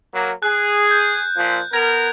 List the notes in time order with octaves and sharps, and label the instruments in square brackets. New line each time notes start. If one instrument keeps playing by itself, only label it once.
[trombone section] F#3 A#3
[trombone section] G#4 [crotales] F#6
[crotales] G6
[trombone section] A#2 F3
[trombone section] B3 A#4 [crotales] G#6 F7